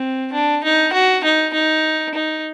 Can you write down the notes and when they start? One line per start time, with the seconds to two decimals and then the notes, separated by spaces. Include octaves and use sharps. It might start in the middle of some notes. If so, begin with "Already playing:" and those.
Already playing: C4
0.33 D4
0.64 D#4
0.93 F#4
1.24 D#4
1.54 D#4
2.14 D#4